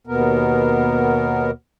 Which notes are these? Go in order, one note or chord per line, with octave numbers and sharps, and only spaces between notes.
D#2 B2 B3 A#4